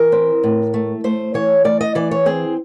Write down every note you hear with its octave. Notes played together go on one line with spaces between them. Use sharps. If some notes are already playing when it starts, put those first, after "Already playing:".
Already playing: E3 A#4
C4
A2
A3
A3 C5
E3 C#5
A3 D5
D#5
E3 D5
C#5
C4 G#4